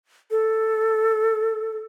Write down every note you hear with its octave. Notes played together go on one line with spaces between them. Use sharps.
A4